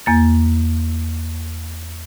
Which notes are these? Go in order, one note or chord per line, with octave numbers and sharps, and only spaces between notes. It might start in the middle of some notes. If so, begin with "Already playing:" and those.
E2 A#3 A6